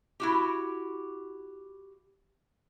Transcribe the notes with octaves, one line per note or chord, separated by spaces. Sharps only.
E4 F#4 G4